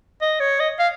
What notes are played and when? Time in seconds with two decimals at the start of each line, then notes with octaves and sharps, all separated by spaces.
0.21 D#5
0.40 C#5
0.60 D#5
0.79 F5